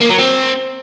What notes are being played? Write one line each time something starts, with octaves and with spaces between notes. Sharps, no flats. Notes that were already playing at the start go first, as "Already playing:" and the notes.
A#3
F#3
C4